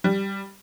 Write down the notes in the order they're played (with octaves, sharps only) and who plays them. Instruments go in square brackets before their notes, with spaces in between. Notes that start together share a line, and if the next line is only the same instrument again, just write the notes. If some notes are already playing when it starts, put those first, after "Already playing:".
[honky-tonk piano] G3